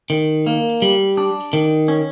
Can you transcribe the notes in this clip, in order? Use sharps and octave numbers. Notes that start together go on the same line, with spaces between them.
D#3
A#3
G3
D4
D#3
C#4